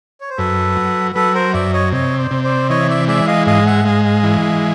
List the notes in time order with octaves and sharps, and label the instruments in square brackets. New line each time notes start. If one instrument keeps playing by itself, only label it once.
[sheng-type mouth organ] C#5
C5
[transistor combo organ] F#2 [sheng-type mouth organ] A4 B4
[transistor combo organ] F#3
[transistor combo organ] F#3 [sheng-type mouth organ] A4 B4
[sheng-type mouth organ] A#4 C5
[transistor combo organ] F#2 [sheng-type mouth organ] D5 E5
[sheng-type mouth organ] C#5 D#5
[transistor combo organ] C3 [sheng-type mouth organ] C#5 D#5
[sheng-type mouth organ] C5 D5
[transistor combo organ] C3
[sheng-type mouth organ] C5 D5
[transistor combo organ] E3 [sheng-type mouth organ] C#5 D#5
[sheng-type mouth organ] D5 E5
[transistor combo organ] G#3 [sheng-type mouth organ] D5 E5
[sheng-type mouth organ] D#5 F5
[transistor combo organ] G#2 [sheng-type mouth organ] D#5 F5
[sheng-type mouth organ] E5 F#5
[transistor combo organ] G#3 [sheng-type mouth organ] D#5 F5
[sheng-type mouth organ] D#5 F5
[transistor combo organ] E3